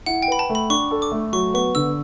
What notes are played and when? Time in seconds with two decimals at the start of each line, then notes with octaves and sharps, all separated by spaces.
0.06 E4 F#5
0.22 G5
0.28 B4 B5
0.39 A5
0.49 A3
0.55 B5
0.70 D4 C#6
0.91 A4
1.02 D6
1.12 A3
1.33 F#3 C#6
1.54 B3 C#6
1.75 D3 E6